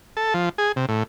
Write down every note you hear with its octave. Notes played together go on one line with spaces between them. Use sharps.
A4
F3
G#4
C3
A2